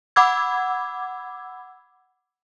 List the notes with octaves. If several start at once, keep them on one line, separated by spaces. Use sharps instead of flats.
F#5 B5 D6 E6 G#6